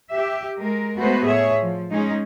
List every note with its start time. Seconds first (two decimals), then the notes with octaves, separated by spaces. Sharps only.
0.10 G4 E5
0.59 G#3 A#4
0.97 G#3 A3 B3 F#4 B4 C5
1.26 A2 G#4 C#5 E5
1.62 F3
1.92 G#3 C#4 D#4 G#4